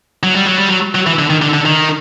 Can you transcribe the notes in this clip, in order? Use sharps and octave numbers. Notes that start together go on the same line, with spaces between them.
F#3
G3
F#3
G3
F#3
F#3
E3
D3
D#3
D3
D3
D#3